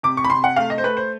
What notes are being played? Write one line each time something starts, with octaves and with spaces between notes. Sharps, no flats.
C3 D6
C#6
B5
C3 C6
F#5
A3 F5
D#5
C5
A3 B4
C5